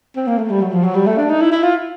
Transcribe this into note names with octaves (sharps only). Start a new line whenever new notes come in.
C4
A#3
A3
G3
F#3
F3
F#3
G3
A3
D4
D#4
E4
E4
F4